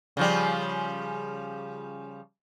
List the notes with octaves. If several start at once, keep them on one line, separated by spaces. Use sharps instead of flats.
C#3 F3 G3